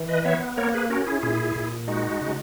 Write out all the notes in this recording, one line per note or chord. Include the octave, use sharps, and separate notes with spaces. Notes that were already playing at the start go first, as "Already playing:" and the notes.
Already playing: E3
B4 D#5
B3 C#5 E5
A#3 A#4 C#5
G#4 B4
C#4 F#4 A#4
E4 G#4
A#2 E4 G#4
A#2
G#3 D#4 F#4
C#3